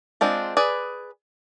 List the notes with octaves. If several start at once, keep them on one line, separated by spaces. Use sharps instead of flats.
G#3 C4 D4 F4
G#4 B4 D5